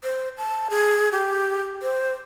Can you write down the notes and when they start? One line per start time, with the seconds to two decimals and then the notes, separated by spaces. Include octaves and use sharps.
0.03 C5
0.38 A5
0.70 G#4
1.12 G4
1.82 C5